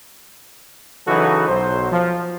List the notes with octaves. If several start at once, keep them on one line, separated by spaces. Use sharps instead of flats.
C#3 E3 F#3 D#4 F#4 A4
B1 F#3 C5
F3